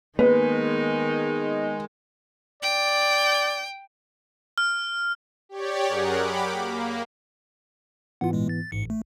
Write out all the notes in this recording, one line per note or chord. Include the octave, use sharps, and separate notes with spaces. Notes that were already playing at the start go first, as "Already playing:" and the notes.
D#3 G#3 A#3 B3 D#4 B4
D5 G5
F6
G4 C#5 D5
F#2 G#4 A#4 F#5
G4 B5 D6
A#3
G#2 E3 B3 F4 F#5
A#2 G#3
A6
A1 G#2 C#7
A3